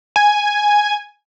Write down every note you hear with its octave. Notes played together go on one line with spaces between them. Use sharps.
G#5